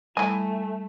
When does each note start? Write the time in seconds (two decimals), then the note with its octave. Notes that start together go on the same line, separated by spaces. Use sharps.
0.17 G3 A3 E4 D#5 G#5